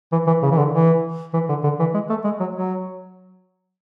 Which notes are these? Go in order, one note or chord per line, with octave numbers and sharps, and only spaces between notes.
E3
E3
C#3
E3
D3
E3
E3
D3
D3
E3
G#3
A3
G#3
F#3
F#3